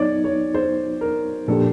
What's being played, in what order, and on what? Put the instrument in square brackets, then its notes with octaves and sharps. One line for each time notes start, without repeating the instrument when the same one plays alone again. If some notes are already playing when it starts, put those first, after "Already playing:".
Already playing: [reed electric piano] F#3 B3 D#4 [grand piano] C#5 D5
[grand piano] C#5
C5
A#4
[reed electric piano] A#2 F3 A#3 D4 G4 [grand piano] A4